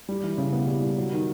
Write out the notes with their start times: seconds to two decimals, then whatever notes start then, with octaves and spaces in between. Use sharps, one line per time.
0.09 G3
0.24 E3
0.38 C#3
0.52 B3
0.67 G3
0.82 G3
0.97 F#3
1.12 D#3